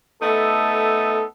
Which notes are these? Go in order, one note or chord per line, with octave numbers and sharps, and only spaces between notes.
A3 B3 D#4 A4